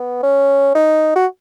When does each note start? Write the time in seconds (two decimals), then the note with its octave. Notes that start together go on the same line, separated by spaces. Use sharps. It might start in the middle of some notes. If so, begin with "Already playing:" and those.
Already playing: B3
0.23 C#4
0.75 D#4
1.16 F#4